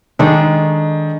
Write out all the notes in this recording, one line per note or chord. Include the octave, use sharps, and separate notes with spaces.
D#3 G#3 D4 A4